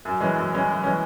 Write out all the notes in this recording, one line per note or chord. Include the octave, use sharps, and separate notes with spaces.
F#2
E3 G#3 C#4
F#2
E3 G#3 C#4
F#2
E3 G#3 C#4